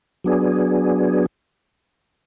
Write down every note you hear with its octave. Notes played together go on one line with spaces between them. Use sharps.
F#3 B3 D4 G#4